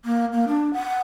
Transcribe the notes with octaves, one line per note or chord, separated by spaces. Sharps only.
A#3
A#3
D4
F#5